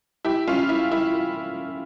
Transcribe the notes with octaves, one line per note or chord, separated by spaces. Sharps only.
E4 G4
C#4 F4
E4
E4